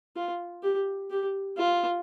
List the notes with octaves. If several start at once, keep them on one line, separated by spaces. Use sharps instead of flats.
F4
G4
G4
F4